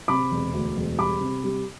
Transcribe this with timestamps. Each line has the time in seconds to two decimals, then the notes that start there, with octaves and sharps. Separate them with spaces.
0.08 C3 B5 D6
0.31 E1
0.54 D2
0.77 E1
0.99 G3 B5 D6
1.21 C3
1.44 G3